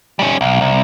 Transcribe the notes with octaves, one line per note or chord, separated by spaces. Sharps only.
G3 C#4
B1
C2